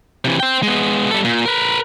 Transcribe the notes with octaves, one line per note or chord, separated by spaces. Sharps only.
C3 E3
C5 G5
G#3 B3
G3 A4
A#2
A#4 B4